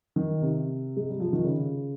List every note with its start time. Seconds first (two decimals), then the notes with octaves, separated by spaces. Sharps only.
0.16 D#3
0.42 C3
0.97 G#3
1.09 G3
1.20 F3
1.33 D#3
1.44 C#3